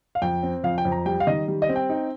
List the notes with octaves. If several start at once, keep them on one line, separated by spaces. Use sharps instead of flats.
F5
F2 G5
C4
F2 F5
G5
F2
A#5
G3 G5
F5
D#3 D#5
G3
D#5
C4
G5
D#4